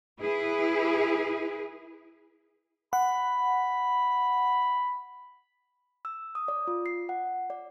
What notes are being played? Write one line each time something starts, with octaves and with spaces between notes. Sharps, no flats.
E4 G#4 B4
F#5 B5
E6
D#6
D5
F4
C7
F#5
D5